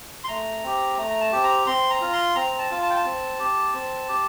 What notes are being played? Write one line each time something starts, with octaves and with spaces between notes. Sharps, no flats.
C6
A3 A#5
C4 G4
A3 A#5
A#5
A5
C4 G4
A#5
C4 C6
A#5
F4
C6
C4 A#5
A5
F4
A5
G5
A5
C4
G4
C4
G4